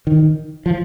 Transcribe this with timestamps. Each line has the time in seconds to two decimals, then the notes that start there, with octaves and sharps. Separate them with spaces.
0.07 D#3
0.66 F3